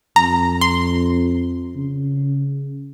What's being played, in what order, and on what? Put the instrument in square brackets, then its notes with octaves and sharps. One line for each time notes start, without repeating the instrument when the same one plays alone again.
[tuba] F2 [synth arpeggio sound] A#5
[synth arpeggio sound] C6
[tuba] C#3